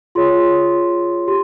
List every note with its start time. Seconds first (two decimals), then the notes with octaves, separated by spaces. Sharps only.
0.15 F4 G#4 C#5 C6
1.28 G4 C6